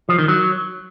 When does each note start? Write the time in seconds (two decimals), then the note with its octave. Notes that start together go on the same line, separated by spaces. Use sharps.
0.09 F3
0.19 D#3
0.28 F#3